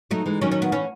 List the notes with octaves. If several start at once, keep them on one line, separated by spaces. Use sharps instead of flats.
F#3 A3 D#4
E3 G#3
D#3 F#3 C#4
C#4
B3
E3 C#4